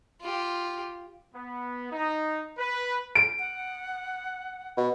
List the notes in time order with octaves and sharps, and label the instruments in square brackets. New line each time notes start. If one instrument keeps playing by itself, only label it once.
[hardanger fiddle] F4 G4
[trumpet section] B3
D#4
B4
[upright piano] D7
[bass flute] F#5
[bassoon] B2